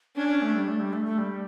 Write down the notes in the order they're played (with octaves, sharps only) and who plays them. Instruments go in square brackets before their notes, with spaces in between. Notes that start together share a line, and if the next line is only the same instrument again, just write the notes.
[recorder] C#4 [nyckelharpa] D4
[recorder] C#4
A3
G3
A3
G3
A3
A3
G3